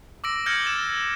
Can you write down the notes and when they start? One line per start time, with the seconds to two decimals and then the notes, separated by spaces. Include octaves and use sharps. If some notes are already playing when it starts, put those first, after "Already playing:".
0.24 D6 E6 A#6 D7
0.46 F6 G6 G#6 A#6 C#7 F#7
0.64 G#6 A6 E7